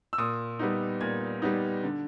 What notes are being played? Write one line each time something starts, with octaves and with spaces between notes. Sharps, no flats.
E6
A#2 D#6
G3 B3 D#4
A#2 G#6
G3 B3 D#4
D3